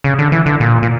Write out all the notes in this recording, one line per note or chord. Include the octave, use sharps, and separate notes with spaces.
C#3
D3
E3
D3
A#2
A#2